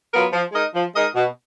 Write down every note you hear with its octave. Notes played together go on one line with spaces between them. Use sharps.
F#3 B3 F4 A#4
F3
G#3 D#4 A#4 D#5
F3
G#3 D#4 A#4 D#5
B2